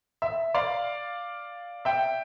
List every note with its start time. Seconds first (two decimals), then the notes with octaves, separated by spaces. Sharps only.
0.22 E5
0.54 D5 F5
1.85 E5 G5